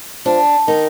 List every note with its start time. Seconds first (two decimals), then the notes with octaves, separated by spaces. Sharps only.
0.26 F3 D4
0.68 D#3 D#4